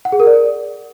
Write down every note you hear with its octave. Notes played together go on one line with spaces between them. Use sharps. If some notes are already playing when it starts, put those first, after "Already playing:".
F#5
G#4
A#4
D5